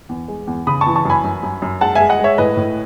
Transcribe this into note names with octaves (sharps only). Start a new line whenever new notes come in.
E2
G#3
E2
C#3 B5 D#6
A5 C#6
E3
A5 C#6
F#2 G#5 B5
F#2
F#2
F#2
G#3 F#5 A5
G#3 E5 G#5
D#5 F#5
G#3 C#5 E5
A2 B4 D#5
A2